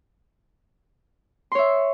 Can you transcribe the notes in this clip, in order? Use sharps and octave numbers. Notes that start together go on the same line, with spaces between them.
C#5 E5 C6